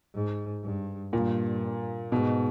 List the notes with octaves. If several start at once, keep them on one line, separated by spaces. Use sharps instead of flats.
G#2
G2
G2 A#2
G#2 B2